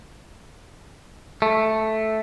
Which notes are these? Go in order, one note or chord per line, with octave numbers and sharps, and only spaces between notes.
A3